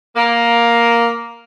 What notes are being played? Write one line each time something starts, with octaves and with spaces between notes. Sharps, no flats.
A#3